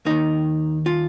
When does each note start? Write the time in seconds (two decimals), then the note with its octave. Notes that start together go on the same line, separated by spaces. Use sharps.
0.06 D#2 D#3 D#4
0.86 F4